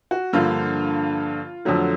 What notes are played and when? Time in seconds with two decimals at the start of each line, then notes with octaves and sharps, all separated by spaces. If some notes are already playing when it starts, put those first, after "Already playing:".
0.11 F#4
0.33 G2 D3 F3 A#3 F4
1.65 F2 D3 F#3 A3